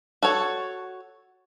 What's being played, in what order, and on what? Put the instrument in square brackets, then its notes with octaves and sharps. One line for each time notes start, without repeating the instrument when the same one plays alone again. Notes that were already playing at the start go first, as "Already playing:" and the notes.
[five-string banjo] F#4 A4 C#5